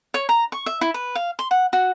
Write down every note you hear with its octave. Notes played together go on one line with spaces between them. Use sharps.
C#5
A#5
C#6
E5
E4
B4
F5
C6
F#5
F#4